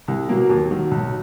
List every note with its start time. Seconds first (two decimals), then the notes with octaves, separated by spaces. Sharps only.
0.08 C2
0.29 B2 F#3 A#3
0.50 D#2
0.71 D#3 F#3
0.91 B1